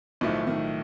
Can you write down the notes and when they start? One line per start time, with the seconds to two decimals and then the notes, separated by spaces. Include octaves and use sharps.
0.21 B1 A2 D#3 F3 A3
0.47 D#3